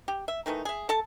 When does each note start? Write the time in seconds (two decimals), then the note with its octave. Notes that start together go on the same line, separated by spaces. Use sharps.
0.08 G4
0.28 E5
0.46 D#3 E3 A3 D#4
0.65 G#4 E5
0.89 A4 A5